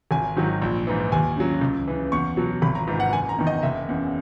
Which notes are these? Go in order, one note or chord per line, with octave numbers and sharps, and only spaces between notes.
G#1 G#5
G#2 D#3 F#3
A#1
G#2 E3
D#2 G#5
C#3 F#3
C#2
C#3 E3
E2 C#6
B2 F#3
G#1 B5
A#5
G#2 E3
F#5
F#1 G#5
A#5
E2 D#3
D#5
F#1 E5
E2 C#3